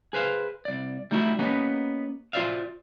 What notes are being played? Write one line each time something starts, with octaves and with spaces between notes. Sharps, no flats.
G#4 B4 C5 F5
C2 D5
G3 A3 D#4 E4 F#4
A#3 B3 C#4 D#4 G4 B4
F4 F#4 C5 D5 E5 F5